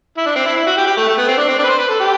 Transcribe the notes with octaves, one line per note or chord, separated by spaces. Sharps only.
E4
D4
C4
E4
E4
F#4
G4
G4
A3
A3
B3
C4
D4
C4
D4
B4
C5
B4
A4
G4